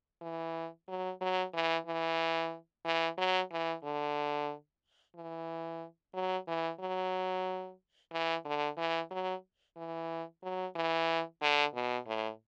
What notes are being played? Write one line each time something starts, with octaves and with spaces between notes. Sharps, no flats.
E3
F#3
F#3
E3
E3
E3
F#3
E3
D3
E3
F#3
E3
F#3
E3
D3
E3
F#3
E3
F#3
E3
D3
B2
A2